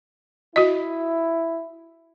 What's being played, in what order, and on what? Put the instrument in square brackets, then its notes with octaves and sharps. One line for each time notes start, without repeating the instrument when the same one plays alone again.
[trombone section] E4 [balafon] F#4 D#5